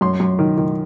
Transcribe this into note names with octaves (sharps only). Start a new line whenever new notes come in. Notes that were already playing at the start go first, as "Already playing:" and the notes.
F#2 C6
F#2
D#3
D#3